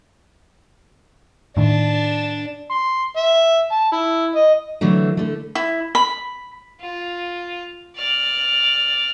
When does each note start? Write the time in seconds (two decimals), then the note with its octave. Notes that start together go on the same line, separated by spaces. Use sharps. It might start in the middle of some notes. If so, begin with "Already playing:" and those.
1.57 A2 D#3 D4 A5
2.71 C6
3.17 E5
3.72 A5
3.93 E4
4.36 D#5
4.81 D3 E3 F#3 A3
5.17 D3 A3
5.55 E4
5.95 B5
6.81 F4
7.97 D5 F6